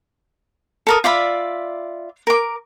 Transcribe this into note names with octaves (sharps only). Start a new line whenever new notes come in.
A4 A#4 D#6
F4 D5 E5 B5
A#4 D6